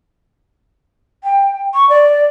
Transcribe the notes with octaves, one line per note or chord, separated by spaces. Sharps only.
G5
C#6
D5